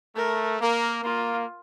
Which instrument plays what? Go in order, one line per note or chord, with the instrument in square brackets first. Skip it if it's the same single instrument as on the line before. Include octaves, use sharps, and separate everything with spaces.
[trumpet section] A3 [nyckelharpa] A#4
[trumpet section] A#3 [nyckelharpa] A#4
[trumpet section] A#3 [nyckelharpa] F4